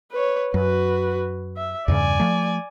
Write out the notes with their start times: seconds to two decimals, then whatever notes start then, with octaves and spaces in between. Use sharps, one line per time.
0.11 B4 C#5
0.54 F#2 F#4 B4
1.57 E5
1.88 E2 G2 C#3 D5 G#5
2.20 F3 A3